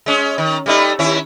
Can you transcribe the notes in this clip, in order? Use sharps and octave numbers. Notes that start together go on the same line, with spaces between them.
G#3 C#4
D#3
G3 A3 D#4
D#2 C#4 E4